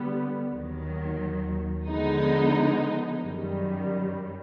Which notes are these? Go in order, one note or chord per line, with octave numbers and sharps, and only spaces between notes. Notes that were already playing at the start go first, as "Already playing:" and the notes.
Already playing: D3 G3 B3
D#2 D#3 F#3
D3 F3 G#3 B3 D#4
F#2 D#3 G3